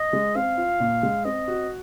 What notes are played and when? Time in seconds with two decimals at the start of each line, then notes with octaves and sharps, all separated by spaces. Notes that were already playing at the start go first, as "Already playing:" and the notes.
Already playing: D#5
0.13 G#3
0.35 C4 F5
0.57 F4
0.80 A#2
1.03 G#3
1.25 C4 D#5
1.48 F#4